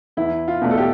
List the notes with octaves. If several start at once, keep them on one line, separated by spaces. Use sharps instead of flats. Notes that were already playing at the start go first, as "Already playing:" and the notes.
E2 E4
F4
B2 A3 D4
A4
G4